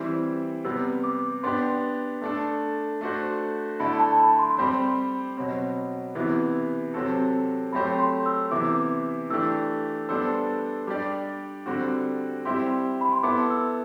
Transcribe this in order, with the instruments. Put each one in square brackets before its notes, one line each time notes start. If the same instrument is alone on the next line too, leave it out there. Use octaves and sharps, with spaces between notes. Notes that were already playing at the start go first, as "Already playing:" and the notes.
Already playing: [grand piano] E3 G3 C4 E4
[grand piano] C3 G3 B3 [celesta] E6
[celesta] D6
[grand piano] B3 D4 G4 [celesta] C6
[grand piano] A3 D4 A4
A3 D4 F#4 C5
[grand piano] D3 A3 E4 A4 D5 [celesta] B5
[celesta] A5
B5
C6
C6
[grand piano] G3 C4 G4 C5 [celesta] B5
[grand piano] B2 F#3 C4
C3 E3 B3 E4
C3 F#3 C4 F#4 A4
[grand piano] F#3 A3 C4 G4 C5 [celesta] B5
[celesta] C6
E6
[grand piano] C3 E3 B3 E4 [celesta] D6
[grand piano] E3 A3 D4 G4 [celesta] E6
[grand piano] G3 B3 D4 A4 C5 [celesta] E6
[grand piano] G3 D4 G4 D5 [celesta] D6
[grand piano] D3 G3 C4 F#4
[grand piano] G3 C4 E4 G4 [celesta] C6
[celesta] B5
C6
[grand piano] B3 E4 A4 [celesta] D6
[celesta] E6